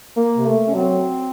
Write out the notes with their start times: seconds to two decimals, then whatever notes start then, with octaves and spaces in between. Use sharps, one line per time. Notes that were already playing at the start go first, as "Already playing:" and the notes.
0.17 A#3
0.36 C3
0.46 A3
0.68 C#4
0.74 F#3 C4